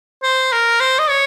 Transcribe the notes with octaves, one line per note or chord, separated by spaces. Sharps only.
C5
A#4
C5
D#5
C#5